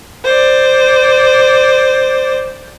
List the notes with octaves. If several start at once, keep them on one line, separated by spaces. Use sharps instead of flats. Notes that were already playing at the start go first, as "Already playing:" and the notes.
C5 D5